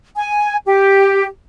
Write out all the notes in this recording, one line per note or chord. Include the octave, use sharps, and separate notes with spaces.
G#5
G4